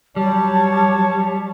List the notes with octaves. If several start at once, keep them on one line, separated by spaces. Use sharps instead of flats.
F#3 G3 C#5 A5